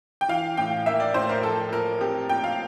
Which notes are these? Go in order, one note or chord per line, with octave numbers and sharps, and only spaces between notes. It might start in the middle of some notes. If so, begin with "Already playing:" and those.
G5
E3 F5
A2 G5
A#3 E5
D5
A2 C5
A#4
F3 A4
A#2 A#4
C4 G4
A#2 G5
F5